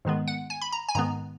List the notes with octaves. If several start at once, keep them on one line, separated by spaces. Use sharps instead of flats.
G#2 D#3 G#3 B3
F#5
G#5
B5
A#5
G#5
G#2 D#3 G#3 B3 A#5